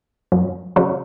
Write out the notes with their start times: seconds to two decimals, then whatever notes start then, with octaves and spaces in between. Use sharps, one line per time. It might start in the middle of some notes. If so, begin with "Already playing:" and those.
0.32 F#2
0.76 C#3 F#3